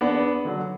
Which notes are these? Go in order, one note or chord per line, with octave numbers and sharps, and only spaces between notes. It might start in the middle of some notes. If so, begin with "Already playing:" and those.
E2 B3 D4
D3 F#3